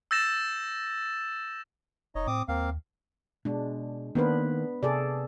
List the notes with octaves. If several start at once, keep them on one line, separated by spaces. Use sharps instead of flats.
E6 G6 A6 A#6 E7
F1 D#4 C#5 D#5
A2 C4 D6 D#6
D#2 A#3 C4 F5
B2 G#3 D4
D#3 A#3 B3 D4 B4 C5
C3 G#4 A4 D5